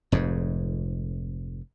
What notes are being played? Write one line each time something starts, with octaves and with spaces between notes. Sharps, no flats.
F1 F2 G#2